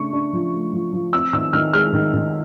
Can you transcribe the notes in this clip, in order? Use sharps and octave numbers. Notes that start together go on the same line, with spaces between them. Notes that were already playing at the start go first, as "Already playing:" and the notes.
Already playing: C#3 A3 D4 C#6
D4
F3
A3
F3
F3
C4 E6
D#3 E6
D#3 F6
G#3 F6
D#3
D#3